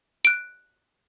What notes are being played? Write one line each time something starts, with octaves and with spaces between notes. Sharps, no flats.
F#6 D7